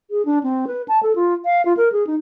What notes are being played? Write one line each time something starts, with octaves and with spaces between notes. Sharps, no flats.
G#4
D4
C4
B4
A5
A4
F4
F5
F4
A#4
G#4
D#4